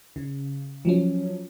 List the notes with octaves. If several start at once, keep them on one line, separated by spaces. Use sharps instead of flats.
C#3
F3 F#3 C#4